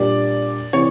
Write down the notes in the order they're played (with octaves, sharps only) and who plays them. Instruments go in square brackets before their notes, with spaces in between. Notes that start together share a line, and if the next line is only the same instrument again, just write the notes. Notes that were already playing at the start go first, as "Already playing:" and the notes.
Already playing: [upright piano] A#2 G3 A#3 D4 G4 [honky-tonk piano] D5
[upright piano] C3 E3 [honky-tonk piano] C#5